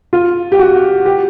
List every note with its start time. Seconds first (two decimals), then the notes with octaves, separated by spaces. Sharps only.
0.13 F4
0.52 G4
0.59 F#4
1.06 G4